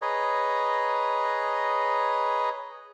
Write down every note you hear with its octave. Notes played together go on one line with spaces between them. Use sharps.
G#4 B4 C#5 D#5 A#5